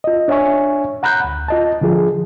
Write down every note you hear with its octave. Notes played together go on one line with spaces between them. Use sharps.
F4 D#5
D4 C#5 E5 G#5 C#6
F#5 A#5 B5 F#6 G6
D2
F4 D#5 A5
D3 F3 F4 G#4